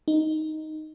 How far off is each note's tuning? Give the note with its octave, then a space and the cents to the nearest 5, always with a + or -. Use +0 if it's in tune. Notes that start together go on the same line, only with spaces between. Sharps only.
D#4 +0